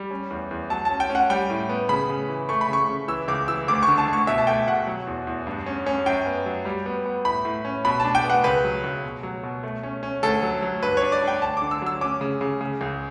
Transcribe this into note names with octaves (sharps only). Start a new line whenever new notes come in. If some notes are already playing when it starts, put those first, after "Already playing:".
Already playing: G3
C#4
E2
E2
F#3 A5
A5
C#4
G5
C#4
F#5
G3 G5
A2
B3
C#3 B5
C#3
E3
A3 C#6
B5
C#3 C#6
C#3
E3 E6
C#2 D6
E3 E6
D2 D6
C#6
D3
A5
D2
C#6
B2 E5
A5
A3 G5
B2 F#5
F#3
E2
E2
G2
C#4
C#4
F#2 G5
B3
F#3
G3
B3
B3
A2 B5
A2
C#4
B2 B5
D4 A5
G5
B3
F#5
C#2 B4
F#3
C#2
B2
F#3
B2
A3
C#4
C#4
D2 A4
F#3
F#3
G2 B4
D4 C#5
D5
D4
G5
D2 A5
D3 D6
E6
F#3 E6
C#4 D6
C#3
C#3
C#3
C#2